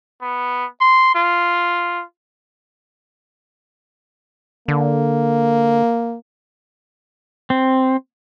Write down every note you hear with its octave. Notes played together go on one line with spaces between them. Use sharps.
B3
C6
F4
D3 A#3
C4